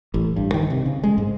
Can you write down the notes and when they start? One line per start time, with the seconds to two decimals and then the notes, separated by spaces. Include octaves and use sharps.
0.14 A1
0.36 G2
0.54 D#3
0.70 C3
0.86 C#3
1.03 G#3
1.18 G#2